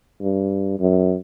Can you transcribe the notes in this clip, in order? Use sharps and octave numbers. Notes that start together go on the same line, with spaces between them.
G2
F#2